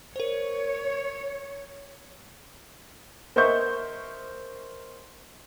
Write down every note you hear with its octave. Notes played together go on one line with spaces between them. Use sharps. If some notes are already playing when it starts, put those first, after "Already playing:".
A#4 C5 C#5
A#4 C5 D#5 E5 C#6 G6